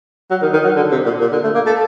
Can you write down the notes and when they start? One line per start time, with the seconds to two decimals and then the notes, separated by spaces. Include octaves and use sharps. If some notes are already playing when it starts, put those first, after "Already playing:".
0.30 F#3
0.42 D#3
0.53 D#3
0.64 F#3
0.76 D3
0.91 C3
1.06 A#2
1.21 A#2
1.32 D3
1.43 A3
1.54 A#3
1.66 A4